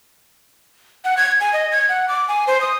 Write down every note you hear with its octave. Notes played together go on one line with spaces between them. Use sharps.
F#5
G#6
G#5
D#5
G#6
F#5
D6
G#5
C5
D#6